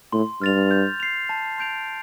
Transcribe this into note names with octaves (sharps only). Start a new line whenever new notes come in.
A2 C6
G2 F6 A6 F7
G6
C7 F7
A5
C6 G6 D7 F7